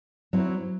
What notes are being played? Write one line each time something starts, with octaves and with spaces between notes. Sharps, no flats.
F#3 C4 E4